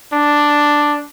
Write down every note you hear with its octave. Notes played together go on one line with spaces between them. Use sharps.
D4